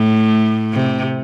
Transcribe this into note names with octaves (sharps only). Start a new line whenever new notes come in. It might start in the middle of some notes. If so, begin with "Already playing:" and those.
Already playing: A2
C3